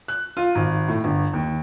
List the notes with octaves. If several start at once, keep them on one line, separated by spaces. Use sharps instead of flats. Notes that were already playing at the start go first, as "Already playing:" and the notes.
F#6
F4
G#1
A2
G1
D#2